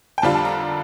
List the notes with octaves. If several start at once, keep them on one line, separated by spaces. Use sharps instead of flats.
G5
F2 D3 G3 D4 F4 A5
A5
A#5